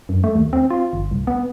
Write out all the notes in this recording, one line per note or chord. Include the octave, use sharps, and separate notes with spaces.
F#2
A3
D#2
C4
F4
G1
C2
B3